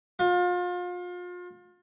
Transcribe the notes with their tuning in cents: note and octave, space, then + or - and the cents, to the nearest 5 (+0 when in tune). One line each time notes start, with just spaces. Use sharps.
F4 +35